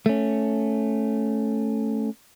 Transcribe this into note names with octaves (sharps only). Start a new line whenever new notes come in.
A3 C#4